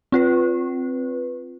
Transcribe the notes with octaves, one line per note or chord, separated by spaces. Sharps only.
C4 F4 B4